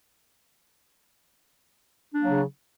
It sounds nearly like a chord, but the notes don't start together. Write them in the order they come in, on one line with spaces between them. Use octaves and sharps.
D4 A#3 F#3 C#3